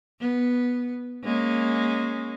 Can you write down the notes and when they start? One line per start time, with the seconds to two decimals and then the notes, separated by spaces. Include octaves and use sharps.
0.21 B3
1.24 G#3 A#3 C#4